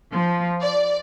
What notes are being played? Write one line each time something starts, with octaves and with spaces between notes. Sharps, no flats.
F3
D5